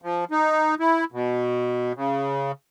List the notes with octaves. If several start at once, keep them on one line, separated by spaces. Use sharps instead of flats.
F3
D#4
E4
B2
C#3